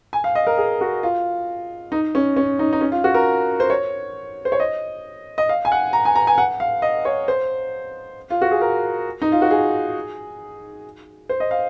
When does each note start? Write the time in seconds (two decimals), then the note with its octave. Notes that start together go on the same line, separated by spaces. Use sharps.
0.13 G#5
0.24 F5
0.35 D#5
0.47 A#4
0.58 G#4
0.81 F#4
1.03 F4
1.92 D#4
2.15 C#4
2.37 C#4
2.59 D#4
2.73 D#4
2.81 C#4
2.92 F4
3.04 F#4
3.14 A#4
3.60 C5
3.70 C#5
4.45 C5
4.52 C#5
4.60 D#5
5.38 D#5
5.49 F5
5.65 G#5
5.72 F#5
5.93 A#5
6.05 G#5
6.16 A#5
6.27 G#5
6.38 F#5
6.60 F5
6.82 D#5
7.05 C#5
7.28 C5
8.30 F4
8.41 F#4
8.51 G#4
8.62 A#4
9.22 D#4
9.32 F4
9.42 F#4
9.51 G#4
11.29 C5
11.40 D#5
11.51 F5